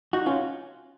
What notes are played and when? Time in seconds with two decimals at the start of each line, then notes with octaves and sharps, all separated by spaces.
0.13 D#4 F#4
0.26 C#4 F4